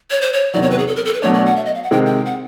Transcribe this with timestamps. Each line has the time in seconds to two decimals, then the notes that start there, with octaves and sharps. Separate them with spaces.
0.11 C#5
0.21 C5
0.33 C#5
0.53 E2 C3 D#3 F#3 D5
0.62 C#5
0.71 B4
0.79 G#4
0.87 A4
0.96 A#4
1.05 A4
1.14 B4
1.22 B2 F#3 A3 D4 C#5
1.33 D5
1.46 F#5
1.56 E5
1.65 D#5
1.75 F5
1.83 F#5
1.91 C3 D#3 G#3 C4 G5
2.06 G5
2.25 F#5